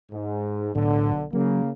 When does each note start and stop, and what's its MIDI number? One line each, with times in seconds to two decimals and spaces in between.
0.11 0.70 44
0.76 1.25 35
0.76 1.12 45
0.76 1.25 50
1.33 1.71 49
1.33 1.62 54
1.33 1.71 58